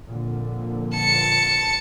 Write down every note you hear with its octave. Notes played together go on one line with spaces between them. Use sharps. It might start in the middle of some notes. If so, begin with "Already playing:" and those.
F2 A#2 D3
A5 C#7